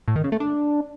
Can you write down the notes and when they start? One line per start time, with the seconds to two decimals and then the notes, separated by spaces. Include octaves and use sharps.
0.08 A2
0.16 D#3
0.24 C#3
0.32 A3
0.40 D4